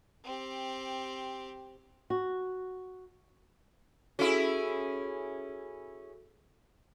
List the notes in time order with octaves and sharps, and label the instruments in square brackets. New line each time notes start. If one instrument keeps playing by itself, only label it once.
[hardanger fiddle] C4 G4
[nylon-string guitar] F#4
[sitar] C#4 E4 G#4 [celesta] F#4 A4